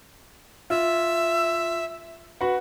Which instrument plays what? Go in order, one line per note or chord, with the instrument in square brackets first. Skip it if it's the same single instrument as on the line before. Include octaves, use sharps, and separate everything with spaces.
[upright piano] F4 [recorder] E5
[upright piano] F#4 B4 F#5